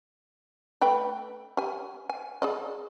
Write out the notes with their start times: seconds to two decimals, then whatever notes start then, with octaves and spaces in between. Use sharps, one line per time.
0.81 A3 B4 G5
1.57 G4 G#5
2.09 G#5
2.42 G#4 D5 D#5